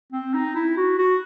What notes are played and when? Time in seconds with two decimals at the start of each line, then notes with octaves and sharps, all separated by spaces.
0.12 C4
0.34 D#4
0.55 E4
0.77 F#4
0.98 F#4